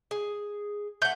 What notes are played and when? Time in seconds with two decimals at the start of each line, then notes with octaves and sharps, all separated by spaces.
0.11 G#4
1.02 A3 F#5 G6